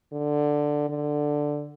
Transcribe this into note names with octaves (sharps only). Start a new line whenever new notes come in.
D3
D3